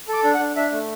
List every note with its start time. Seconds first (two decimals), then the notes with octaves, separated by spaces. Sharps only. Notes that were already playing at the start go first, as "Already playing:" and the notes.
0.08 A4 D6
0.24 D4
0.34 F#5
0.40 D4
0.56 D4 E5
0.72 A3